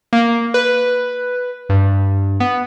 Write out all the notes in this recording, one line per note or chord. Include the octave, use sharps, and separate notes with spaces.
A#3
B4
G2
B3